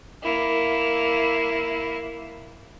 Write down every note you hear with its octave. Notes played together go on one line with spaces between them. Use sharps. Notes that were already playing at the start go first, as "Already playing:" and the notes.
A#3 E4